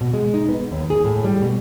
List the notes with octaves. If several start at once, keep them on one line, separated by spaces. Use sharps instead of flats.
B2
G#3
D#4
B3
D#2
G#4
A2
G3
B2